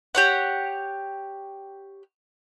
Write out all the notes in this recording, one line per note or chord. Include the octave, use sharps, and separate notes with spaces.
G4 C#5 F#5